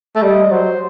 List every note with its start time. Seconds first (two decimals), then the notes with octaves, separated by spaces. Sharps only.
0.16 A3
0.22 G3 D#5
0.51 F#3 C5